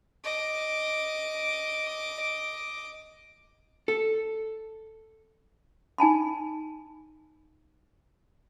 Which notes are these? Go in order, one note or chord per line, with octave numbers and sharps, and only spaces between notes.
D#5 D6
A4
D#4 G#5 A5 B5